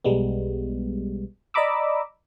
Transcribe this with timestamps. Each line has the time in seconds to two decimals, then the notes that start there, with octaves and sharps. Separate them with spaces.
0.04 B1 G3 G#3 B3
1.54 D5 D#5 A#5 B5 D6 E6